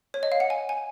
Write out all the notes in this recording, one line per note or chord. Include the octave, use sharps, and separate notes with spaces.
C#5
D#5
F5
F#5
G#5
G#5